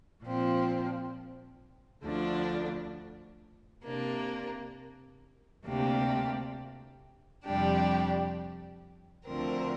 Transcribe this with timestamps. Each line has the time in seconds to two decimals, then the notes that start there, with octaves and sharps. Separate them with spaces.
0.22 A#2 F3 C4
2.04 D2 D3 F3 D4
3.84 C3 A#3 D4
5.64 D2 C3 A#3 D4 G4
7.46 F2 C3 G3 D4 G4
9.25 D2 D3 F3 C4 A#4